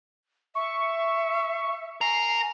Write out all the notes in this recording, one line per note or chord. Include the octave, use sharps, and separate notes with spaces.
E5 C#6
A#4 G#5 C7